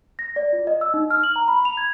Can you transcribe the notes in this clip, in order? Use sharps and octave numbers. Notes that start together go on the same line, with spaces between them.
A#6
D5
F4
D#5
E6
D#4
F6
F#7
A#5
B5
F7
G#6